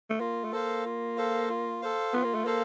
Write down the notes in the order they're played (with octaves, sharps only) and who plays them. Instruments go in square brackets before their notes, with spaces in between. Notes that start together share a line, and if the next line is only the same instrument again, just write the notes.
[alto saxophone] A3
[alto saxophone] A#3 [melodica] F4
[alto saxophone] A3
[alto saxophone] A#3 [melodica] A4 C5 F5
[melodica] F4
A4 C5 F5
F4
A4 C5 F5
[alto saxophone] B3 [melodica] F4
[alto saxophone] A#3
A3
[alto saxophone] A#3 [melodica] A4 C5 F5